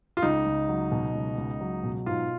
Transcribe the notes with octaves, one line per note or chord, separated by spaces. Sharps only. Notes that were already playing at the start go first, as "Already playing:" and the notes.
F4
C#2 D#4
C#2
F#3
B2
C#2
C#2
F#3
B2
G#2 F4